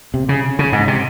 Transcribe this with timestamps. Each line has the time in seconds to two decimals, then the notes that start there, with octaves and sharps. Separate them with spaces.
0.14 C3
0.29 C#3
0.59 C#3
0.72 G#2
0.88 C3